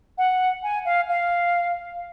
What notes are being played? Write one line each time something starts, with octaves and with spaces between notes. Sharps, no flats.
F#5
G#5
F5
F5